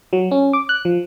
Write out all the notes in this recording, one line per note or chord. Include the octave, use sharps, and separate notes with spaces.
F#3
C#4
D6
F#6
F3